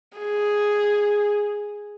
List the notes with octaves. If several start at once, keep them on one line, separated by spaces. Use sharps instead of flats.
G#4